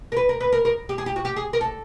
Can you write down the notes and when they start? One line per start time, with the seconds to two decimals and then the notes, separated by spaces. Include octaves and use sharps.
0.12 A#4
0.17 B4
0.29 A#4
0.40 B4
0.52 A#4
0.65 A#4
0.89 G4
0.98 G#4
1.06 G4
1.16 F#4
1.25 G4
1.36 G#4
1.53 A#4
1.61 A4